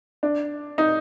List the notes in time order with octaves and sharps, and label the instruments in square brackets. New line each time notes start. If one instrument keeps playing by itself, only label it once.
[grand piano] D4
D#4